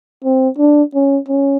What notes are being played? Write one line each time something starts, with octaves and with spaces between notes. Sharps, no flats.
C4
D4
C#4
C#4